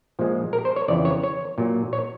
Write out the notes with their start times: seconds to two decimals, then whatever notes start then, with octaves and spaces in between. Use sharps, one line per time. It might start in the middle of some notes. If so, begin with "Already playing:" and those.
0.19 A#2 F3 G#3
0.53 A#4
0.65 C5
0.76 C#5
0.88 F2 C#3 E3 D5
1.05 C#5
1.24 C#5
1.58 A#2 F#3
1.93 C#5